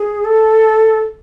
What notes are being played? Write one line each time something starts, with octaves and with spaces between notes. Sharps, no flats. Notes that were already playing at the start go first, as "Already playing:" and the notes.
Already playing: G#4
A4